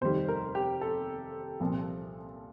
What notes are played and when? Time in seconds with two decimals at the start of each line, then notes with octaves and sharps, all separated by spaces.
0.01 F1 D#2 D#3 G3 C5
0.28 A#4
0.55 G4
0.81 A4
1.60 C2 A#2 F3